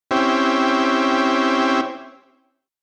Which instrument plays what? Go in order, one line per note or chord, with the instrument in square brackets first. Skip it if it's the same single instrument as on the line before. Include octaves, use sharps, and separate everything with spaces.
[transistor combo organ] C4 C#4 E4 G4